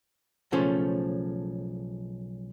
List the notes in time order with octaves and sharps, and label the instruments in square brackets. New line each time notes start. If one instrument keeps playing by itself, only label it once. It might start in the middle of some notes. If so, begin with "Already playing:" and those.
[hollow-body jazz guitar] B1 C#3 F3 A3 C#4 C5